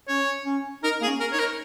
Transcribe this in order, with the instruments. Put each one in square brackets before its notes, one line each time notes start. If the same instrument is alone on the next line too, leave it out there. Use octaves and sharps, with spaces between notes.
[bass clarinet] C#4 [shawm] C#5
[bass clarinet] C#4
[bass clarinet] D#4 [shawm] A#4
[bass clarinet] A#3 [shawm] G#4
[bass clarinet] C#4
[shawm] A#4
[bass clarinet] D#4 [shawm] C#5
[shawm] A#4